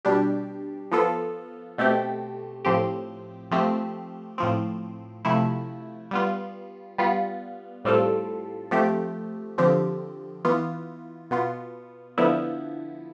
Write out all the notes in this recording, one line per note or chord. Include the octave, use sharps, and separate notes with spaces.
B2 G3 D4 G4
F3 B3 F4 A4
B2 A3 C4 G4
A2 F3 C4 G4
F3 A3 C4 G4
A2 F3 C4
C3 F3 A3 E4
G3 B3 F4
G3 B3 F4
A2 G3 C4 F4 A4
F3 A3 C4 G4
D3 F3 C4 G4
E3 B3 F4
B2 B3 F4
D3 F3 B3 E4